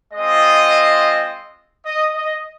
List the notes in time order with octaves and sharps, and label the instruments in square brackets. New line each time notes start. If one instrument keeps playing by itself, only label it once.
[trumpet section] G#3 C4 F4 D#5
D#5
D#5